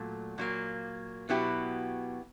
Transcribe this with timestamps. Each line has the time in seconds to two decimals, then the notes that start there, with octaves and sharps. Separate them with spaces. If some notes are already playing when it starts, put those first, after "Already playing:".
Already playing: A#2 F#3 A3
0.38 A#2 F#3 A#3
1.29 B2 F#3 B3 E4 G4